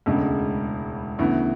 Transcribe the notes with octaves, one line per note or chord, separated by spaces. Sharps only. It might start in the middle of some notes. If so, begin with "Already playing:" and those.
E1 D2 C#3 G#3
D2 C#3 E3 B3 E4